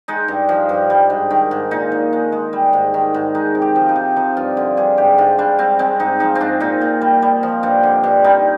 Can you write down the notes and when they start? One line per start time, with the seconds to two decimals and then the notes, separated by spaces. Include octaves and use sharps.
0.08 G#3 D#4
0.28 G2
0.49 F3
0.69 G2
0.90 G3
1.10 G#2
1.31 D#3
1.51 G#2
1.71 A#2 D#4
1.92 A#2
2.13 G#3
2.32 G#3
2.53 G3
2.73 G#2
2.94 D#3
3.14 G#2
3.35 G#3 D#4
3.55 C3
3.62 G4
3.76 F3
3.89 D#4
3.96 C3
4.16 F3 D#4
4.37 G2 F4
4.57 D3
4.77 G2 G#4
4.98 G#2 G4
5.18 G#2 F4
5.38 G3 D4
5.59 G3 C4
5.79 G#3 C4
6.00 G#2 D#4
6.20 F3 D#4
6.35 C4
6.41 G#2 D4
6.60 A#2 D#4
6.81 A#2
7.01 G3
7.22 G3
7.43 F3
7.63 G2
7.83 D3
8.04 G2
8.24 G3 D#4